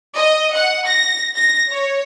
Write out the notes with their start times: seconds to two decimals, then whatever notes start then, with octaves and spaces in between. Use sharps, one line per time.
0.15 D#5
0.54 F#5
0.87 A#6
1.36 A#6
1.70 C#5